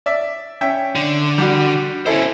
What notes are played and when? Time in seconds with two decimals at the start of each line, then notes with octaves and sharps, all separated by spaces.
0.06 D5 E5
0.61 C#4 E5 G5
0.95 D3
1.38 G3 F#4
2.06 C#4 E4 A4 C5 G#5